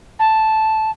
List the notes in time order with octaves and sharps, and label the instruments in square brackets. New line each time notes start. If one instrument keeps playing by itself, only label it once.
[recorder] A5